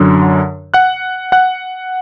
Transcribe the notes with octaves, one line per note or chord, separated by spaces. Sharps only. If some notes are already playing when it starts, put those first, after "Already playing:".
Already playing: F#2 D3 F#3
F#5 F#6
F#5 F#6